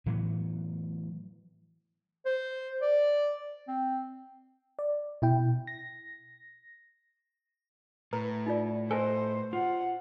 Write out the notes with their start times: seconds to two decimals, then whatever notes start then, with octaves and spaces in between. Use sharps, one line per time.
0.06 A2 E3 F#3 B3
2.25 C5
2.82 D5
3.68 C4
4.79 D5
5.22 B2 E4 G5
5.67 A#6
8.13 A2 B4 A#5
8.46 D#4 F4 D5
8.91 A4 B4 C5 D#5 G#5 A5
9.53 F4 F#5